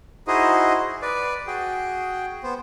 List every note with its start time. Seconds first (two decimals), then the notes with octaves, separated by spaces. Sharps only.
0.27 D#4 E4 F#4 G#4 C5 D#5
1.02 B4 D5
1.47 F#4 G#4 G5
2.43 B3 C5